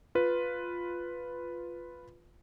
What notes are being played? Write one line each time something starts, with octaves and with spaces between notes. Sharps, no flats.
F4 B4